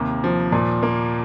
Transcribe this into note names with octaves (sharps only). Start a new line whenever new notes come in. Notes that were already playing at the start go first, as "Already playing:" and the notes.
Already playing: D#2 C3 A#3
F3
A#2
A#3